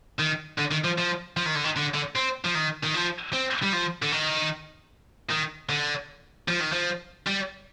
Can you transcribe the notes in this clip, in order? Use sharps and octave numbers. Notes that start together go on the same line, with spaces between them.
D#3
D3
D#3
F3
F3
F3
D#3
D3
D#3
D3
D3
C4
F3
D#3
D#3
F3
C4
G3
F3
D3
D#3
D#3
D3
F3
D#3
F3
G3